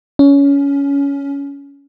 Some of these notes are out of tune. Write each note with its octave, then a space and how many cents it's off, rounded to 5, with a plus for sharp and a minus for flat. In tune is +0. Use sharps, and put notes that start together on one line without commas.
C#4 +20